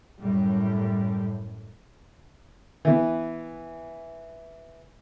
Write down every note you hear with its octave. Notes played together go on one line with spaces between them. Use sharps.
F#2 A2 G3
E3 B3